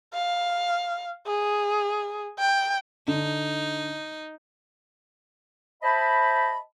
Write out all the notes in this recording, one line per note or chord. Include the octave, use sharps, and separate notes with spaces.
F5
G#4
G5
D3 D#4
C5 D#5 E5 A5 B5